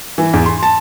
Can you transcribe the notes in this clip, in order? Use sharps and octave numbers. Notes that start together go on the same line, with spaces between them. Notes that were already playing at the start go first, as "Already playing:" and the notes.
E3
E2
C6
A5